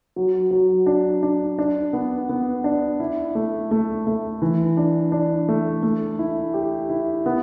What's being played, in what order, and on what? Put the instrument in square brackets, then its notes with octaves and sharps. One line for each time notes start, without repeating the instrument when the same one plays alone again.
[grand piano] F#3
F#3
D4
D4
D4
B3
B3
D4
E4
A3
A3
A3
E3
D4
D4
A3
A3
E4
G4
E4
B3